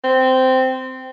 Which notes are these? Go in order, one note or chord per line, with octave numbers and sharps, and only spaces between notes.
C4